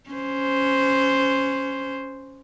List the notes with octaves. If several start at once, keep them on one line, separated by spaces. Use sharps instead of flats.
C#4 C5